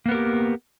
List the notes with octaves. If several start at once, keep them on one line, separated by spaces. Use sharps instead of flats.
A#3 B3 G4 A#4